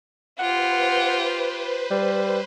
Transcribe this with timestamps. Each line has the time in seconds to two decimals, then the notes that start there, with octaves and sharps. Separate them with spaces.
0.39 F4 G4 B4 C5 F#5
1.91 G3